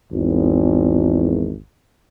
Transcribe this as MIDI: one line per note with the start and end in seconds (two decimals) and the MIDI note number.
0.12 1.56 32
0.12 1.56 40